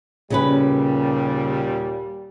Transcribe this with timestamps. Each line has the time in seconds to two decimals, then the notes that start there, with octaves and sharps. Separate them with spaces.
0.30 D#2 A#2 C#3 G3 C#4 B4